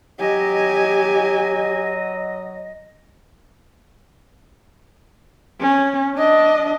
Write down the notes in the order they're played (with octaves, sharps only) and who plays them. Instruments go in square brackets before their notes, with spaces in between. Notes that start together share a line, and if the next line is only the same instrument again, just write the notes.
[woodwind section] F#3 D#5 [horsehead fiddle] G4 G#5
[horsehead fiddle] C#4
D4 D#5